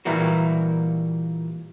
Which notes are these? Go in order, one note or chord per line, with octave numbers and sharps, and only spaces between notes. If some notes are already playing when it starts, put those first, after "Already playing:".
A#2 E3 G3 A#3 F#4